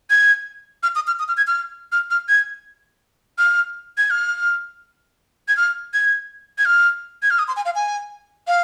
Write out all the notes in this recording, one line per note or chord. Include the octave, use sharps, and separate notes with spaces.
G#6
F6
D#6
F6
D#6
F6
G#6
F6
F6
F6
G#6
F6
G#6
F6
G#6
F6
G#6
G#6
F6
G#6
F6
D#6
C6
G#5
F5
G#5
F5